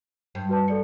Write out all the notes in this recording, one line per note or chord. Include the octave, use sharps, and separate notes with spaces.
G2
F#4 B4 A5
A4 D5 C#7